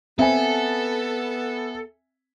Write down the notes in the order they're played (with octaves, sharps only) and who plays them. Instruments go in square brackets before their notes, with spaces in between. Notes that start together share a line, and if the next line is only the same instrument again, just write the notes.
[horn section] B3 [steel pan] C4 [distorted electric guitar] A4 [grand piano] E5 G#5